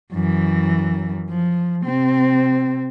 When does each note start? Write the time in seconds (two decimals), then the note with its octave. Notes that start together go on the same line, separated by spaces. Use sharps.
0.13 F#2 E3
1.29 F3
1.85 C3 C4